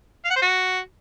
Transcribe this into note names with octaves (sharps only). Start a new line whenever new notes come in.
F5
F#5
C5
F#4